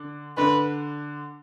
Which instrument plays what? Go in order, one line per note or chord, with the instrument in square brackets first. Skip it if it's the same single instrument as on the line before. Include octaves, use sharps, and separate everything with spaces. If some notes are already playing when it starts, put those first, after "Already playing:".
Already playing: [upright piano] D3 D4
[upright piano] D3 D4 [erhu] B4